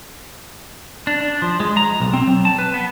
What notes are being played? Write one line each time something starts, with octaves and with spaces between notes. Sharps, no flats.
D4
D4
F3
G#3
A#5
B1
C4
F#3
A5
B4
B3